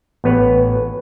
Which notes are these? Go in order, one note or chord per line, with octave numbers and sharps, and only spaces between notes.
A1 B3 B4 C#5